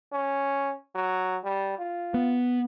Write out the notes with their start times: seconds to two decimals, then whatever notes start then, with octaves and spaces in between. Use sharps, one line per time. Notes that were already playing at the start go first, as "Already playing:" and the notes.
0.13 C#4
0.95 F#3
1.44 G3
1.78 F4
2.14 B3